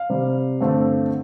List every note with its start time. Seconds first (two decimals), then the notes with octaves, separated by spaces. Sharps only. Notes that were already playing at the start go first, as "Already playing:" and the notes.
Already playing: F5
0.09 C3 G3 C4
0.61 G2 D3 A3 C4